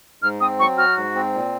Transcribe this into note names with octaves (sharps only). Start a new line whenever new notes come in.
G#2 F6
C4 D#6
F#3 C#6
F#4 F6
G#2
C4
A#2